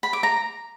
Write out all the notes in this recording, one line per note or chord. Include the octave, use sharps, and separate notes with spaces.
B5
D6
A#5